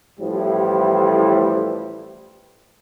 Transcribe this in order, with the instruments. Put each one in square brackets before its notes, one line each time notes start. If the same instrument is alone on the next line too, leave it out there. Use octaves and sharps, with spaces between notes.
[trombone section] A1 A2 E3 F3 G3